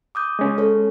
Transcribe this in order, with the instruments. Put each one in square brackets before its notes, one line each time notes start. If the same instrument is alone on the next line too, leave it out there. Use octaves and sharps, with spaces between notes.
[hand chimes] D6 D#6 G6
[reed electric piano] G#3 C#4
[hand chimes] A4 C#5